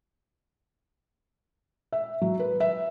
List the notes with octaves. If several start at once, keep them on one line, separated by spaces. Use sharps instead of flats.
E5
F#3
B4
E5